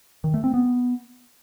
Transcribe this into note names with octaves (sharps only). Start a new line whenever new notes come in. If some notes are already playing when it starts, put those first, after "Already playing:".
D#3
A3
C4
B3